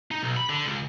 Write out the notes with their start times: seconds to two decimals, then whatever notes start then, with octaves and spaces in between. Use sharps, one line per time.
0.11 D#4
0.23 B1
0.37 B5
0.49 D3
0.66 C#2